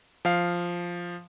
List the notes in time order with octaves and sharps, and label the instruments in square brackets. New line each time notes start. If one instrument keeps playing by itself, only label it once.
[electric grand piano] F3 F5